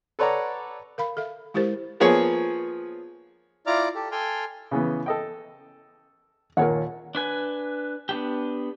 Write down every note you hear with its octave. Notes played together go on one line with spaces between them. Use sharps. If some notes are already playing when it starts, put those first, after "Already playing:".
A4 B4 C#5 D5 F#5 A#5
A#4 F5 B5
A4 E5 F5
G#3 E4 G4 A#4 C5
F3 A#3 B3 G#4 C#5
E4 F4 D5 A#5 D6 F6
G4 A4
A4 G5 G#5 C6 F6
C#3 E3 B3
A4 D#5 G5
D#2 A#2 A#4 C#5 F#5
D4 B4 G#5
B3 D4 G4